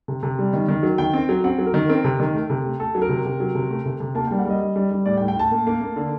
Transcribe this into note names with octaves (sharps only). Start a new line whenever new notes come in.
C3
C3
G3
D#3
D#3
F#3
D#3 G5
C4
F#3
C4 F#5
F#3
A#4
D#3
C4 A#4
C3
D#3
A3
C3
A3
A3 A4
F#3
A#4
C3
C3
F#3
C3
A3
C3
C3
A#3 A5
G5
G3
F#5
G3 D#5
G3
G3
G3
A2 D5
G5
A2
G5
A2 A5
A#3
A#3
A#3
D3